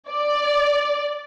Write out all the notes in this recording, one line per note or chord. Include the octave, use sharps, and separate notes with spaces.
D5